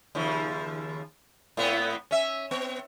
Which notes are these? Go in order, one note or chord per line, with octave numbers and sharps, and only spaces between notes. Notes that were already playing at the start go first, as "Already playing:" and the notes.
D#2 C#3 F3
A2 B3 C4
C#4 E5
B3